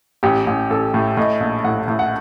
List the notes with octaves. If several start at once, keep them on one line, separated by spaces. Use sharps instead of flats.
A1 G4
A1
A1 A4
A2
A2 D#5
A#1
A2 F#5
A2
F#5